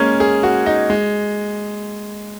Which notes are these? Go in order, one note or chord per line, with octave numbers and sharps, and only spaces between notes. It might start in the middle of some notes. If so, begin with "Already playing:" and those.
Already playing: G#3 A#3 C#4
G#4
F#4
D#4
G#3